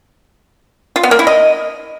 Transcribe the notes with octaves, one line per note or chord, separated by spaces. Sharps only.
F4
B3
A#3
E4
D#5